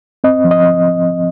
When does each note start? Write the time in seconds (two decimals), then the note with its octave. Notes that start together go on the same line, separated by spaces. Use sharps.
0.24 C4 D#5
0.45 F3
0.51 D#5